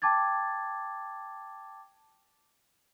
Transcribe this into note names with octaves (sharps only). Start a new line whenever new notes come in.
G5 A5 D6 G#6 A6